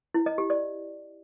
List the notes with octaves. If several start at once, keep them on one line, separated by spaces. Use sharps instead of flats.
E4
D#5
G4
D5